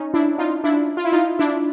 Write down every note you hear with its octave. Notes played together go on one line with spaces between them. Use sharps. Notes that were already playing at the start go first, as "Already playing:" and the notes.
Already playing: C#4 D#4
D4 E4
D#4 F4
D4 E4
F4
E4
D#4 F4
D4 E4